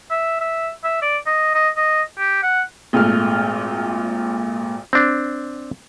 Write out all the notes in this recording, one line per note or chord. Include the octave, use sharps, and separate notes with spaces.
E5
E5
E5
D5
D#5
D#5
D#5
G4
F#5
G#1 A#2 A3 F6
C4 D4